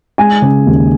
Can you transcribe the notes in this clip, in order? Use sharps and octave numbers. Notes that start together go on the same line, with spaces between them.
G#3 G#5
C#3
D#2